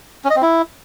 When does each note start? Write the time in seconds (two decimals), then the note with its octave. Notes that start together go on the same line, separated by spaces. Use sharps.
0.25 C#4
0.30 D#5
0.36 C4
0.42 E4